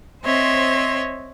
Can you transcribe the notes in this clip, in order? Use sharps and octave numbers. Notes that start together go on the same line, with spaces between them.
C4 C5 C#5 D#5 E5